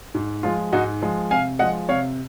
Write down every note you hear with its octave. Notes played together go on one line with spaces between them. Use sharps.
G#2
F3 G#3 F4
G#2 D#4 F#4
F3 G#3
C3 F5 G#5
F3 G#3 D#5 F#5
C3 C#5 F5